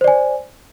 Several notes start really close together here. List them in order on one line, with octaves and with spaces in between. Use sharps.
C5 D5 G#5